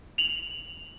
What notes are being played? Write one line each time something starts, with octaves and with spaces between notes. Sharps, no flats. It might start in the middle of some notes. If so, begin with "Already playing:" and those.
F7 F#7